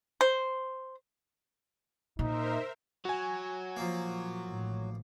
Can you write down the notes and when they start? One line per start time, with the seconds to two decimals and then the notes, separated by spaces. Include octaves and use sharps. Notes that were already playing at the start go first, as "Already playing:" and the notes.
0.21 C5
2.19 A#2 D#4 A#4 C5 E5
3.05 F#3 F#4 G#5
3.77 A#2 F3 A#3
4.45 A1 A2 D#3